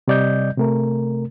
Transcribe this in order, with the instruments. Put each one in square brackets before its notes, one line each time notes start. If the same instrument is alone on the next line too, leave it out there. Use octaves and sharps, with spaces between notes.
[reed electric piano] C3 G3 D5 D#5 G6
C3 A3 A#4